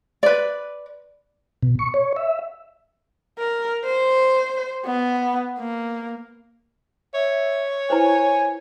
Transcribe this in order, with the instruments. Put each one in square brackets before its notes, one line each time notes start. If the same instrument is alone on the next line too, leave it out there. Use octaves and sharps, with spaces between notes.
[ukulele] B4 D5
[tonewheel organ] B2
C#6
C#5
E5
[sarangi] A#4
C5
B3
A#3
[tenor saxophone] C#5 [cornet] E5
[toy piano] E4 B4 C5 [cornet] G#5